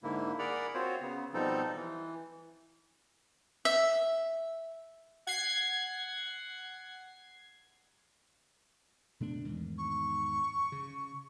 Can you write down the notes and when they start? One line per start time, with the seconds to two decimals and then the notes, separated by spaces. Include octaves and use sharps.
0.03 G#2 D3 A#3 E4
0.39 G#4 A#4 D5 F#5 A#5 B5
0.74 C4 F4 F#4 C5 C#5
1.01 C#3 B3
1.34 B2 F3 G3 C4 D#4 A4
1.76 E3
3.65 E5
5.27 F#5 G#6 C7
9.20 B2 A3 D4
9.44 E2 G#2 D#3
9.78 C#6
10.72 C#3